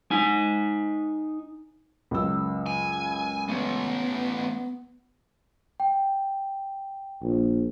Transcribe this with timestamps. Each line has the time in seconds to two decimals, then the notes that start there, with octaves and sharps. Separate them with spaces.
0.11 D#4 G#5
2.11 C#2 F#2 E6
2.66 G#5
3.48 A3 B3 C#4
5.80 G5
7.23 A#1